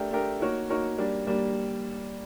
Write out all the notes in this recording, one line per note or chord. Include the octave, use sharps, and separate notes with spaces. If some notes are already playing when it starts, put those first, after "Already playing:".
Already playing: A3 D4 G4 A#4
A3 D4 G4 A#4
A#3 D#4 F#4 A#4 C#5
A#3 D#4 F#4 A#4 C#5
G3 A#3 D4
G3 A#3 D4